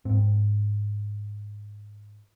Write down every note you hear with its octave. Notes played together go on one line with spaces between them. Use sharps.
G#2 C4